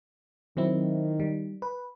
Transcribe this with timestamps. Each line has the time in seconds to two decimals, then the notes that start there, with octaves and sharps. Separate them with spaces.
0.57 D#3 F#3 C4 E4
1.20 G3
1.62 B4